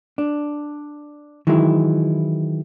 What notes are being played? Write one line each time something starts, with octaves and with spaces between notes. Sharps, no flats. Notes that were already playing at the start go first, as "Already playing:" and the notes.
D4
D#3 E3 F#3 G#3 E4